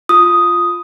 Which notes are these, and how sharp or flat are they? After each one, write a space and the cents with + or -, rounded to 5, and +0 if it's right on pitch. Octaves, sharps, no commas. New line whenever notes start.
F4 +0 D#6 +0